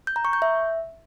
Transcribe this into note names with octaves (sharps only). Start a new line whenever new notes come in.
G6
A#5
C#6
G6
E5